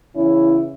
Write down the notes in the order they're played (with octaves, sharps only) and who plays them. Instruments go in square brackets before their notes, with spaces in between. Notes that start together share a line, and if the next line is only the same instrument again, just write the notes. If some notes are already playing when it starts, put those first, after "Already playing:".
[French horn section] E2 C#3 E3 C#4 E4